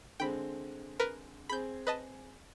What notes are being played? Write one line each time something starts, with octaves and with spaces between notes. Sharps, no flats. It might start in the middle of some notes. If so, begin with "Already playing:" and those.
D3 G#3 C4 G5 B5
A#4 B4
C4 G#4 B5 G6
B4 D#5 A5